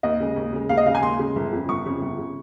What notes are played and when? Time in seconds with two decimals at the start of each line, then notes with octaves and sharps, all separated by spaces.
0.03 D#2 D#5
0.20 C#3 G#3
0.36 D#2
0.53 C#3 G#3
0.69 D#2 F5
0.77 D#5
0.86 C#3 G#3 F5
0.95 G#5
1.03 D#2 C6
1.19 C#3 G#3
1.36 G1
1.52 F2 C#3
1.69 G1 C#6
1.85 F2 C#3
2.02 G1
2.18 C#3